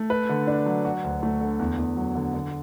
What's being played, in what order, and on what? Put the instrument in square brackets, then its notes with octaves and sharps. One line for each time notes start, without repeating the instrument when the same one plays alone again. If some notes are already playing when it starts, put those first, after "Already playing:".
Already playing: [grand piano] A3
B4
D3
D4
F#3
F#4
D2
A3
D3
E2
E2
F#3
D3
D3